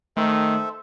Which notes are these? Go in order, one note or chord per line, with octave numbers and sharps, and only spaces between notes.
D#3 A3 A4 C5 E5